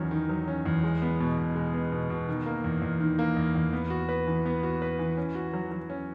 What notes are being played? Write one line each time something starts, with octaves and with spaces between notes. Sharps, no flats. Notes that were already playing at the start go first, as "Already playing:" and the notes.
Already playing: E2 D#3 F#3 C#4
D#3
F#3
C#4
E2
G#3
B3
B2
B2
G#3
B3
B2
B2
D#3
A#3
E2
E2
D#3
A#3
E2
E2
B3
F#4
B4
E3
B3
F#4
B4
E3
C#4
F#4
F#3
F#3
C#4